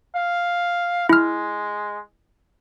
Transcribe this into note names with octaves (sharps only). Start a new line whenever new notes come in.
F5
G#3 E4 F6